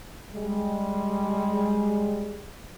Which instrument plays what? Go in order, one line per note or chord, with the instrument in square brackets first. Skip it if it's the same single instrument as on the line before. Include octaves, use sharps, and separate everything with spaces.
[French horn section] G3 G#3